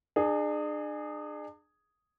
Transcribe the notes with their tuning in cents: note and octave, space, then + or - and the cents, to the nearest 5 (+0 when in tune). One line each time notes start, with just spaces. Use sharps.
D4 +40 G#4 +0